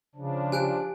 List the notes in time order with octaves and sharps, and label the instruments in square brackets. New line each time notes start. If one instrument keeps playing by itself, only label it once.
[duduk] C#3 [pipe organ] F3 D4
[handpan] G4 [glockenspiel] G#5 F#6 D7